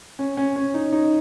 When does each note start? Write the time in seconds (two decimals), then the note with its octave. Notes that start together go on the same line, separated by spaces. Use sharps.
0.19 C#4
0.37 C#4
0.56 C#4
0.74 D#4
0.93 D#4